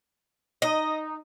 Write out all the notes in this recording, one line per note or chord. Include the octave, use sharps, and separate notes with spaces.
D#4 D#5